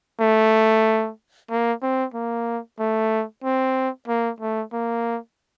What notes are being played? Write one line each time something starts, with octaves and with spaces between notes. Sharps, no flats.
A3
A#3
C4
A#3
A3
C4
A#3
A3
A#3